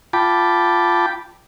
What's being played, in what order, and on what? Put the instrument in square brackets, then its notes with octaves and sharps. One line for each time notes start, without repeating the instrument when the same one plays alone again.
[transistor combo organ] F4 G5 A5 B5 D6